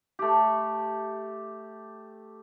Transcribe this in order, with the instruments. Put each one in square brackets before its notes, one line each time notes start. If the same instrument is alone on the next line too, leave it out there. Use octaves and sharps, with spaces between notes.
[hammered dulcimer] A3 G4